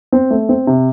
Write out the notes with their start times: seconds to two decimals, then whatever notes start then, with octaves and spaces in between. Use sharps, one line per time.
0.12 C4
0.30 A3
0.49 C4
0.67 C3